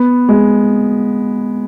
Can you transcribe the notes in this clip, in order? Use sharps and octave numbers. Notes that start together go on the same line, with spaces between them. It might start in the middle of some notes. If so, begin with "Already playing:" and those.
Already playing: B3
G#3